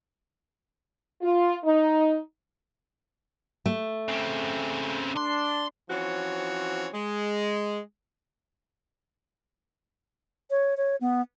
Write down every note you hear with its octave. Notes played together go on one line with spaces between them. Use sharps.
F4
D#4
A3
C#3 C4
D4 C6
E3 F3 C4 C#4 F#4 C#5
G#3
C#5
C#5
B3